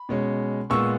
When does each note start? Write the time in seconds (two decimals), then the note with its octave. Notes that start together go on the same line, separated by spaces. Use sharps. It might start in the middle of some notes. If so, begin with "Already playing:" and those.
Already playing: B5
0.09 B2 G#3 C#4
0.70 A#2 G#3 B3 C#6 E6